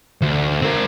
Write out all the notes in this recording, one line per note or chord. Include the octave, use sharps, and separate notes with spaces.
D2
C4 A#4